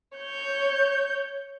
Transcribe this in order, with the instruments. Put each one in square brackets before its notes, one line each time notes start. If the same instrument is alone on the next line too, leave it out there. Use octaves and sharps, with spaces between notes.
[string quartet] C#5 G6